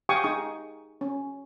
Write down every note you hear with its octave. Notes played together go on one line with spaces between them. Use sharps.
G4 F5 G5 G#5 C#6 D#6
D#4 G#4 C#6 D#6
C#4